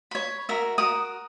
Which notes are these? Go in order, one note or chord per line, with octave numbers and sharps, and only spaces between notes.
C#5 B5
F#4 A#4 E5
F#4 A#4 D#6